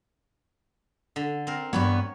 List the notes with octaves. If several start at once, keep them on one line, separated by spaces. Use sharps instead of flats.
D3
C4 A#4
G2 E3 B3 C#5